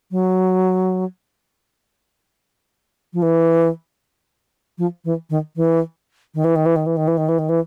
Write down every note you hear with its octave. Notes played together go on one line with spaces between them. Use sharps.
F#3
F3
E3
F3
E3
D#3
E3
D#3
E3
D#3
E3
D#3
E3
D#3
E3
D#3
E3
D#3
E3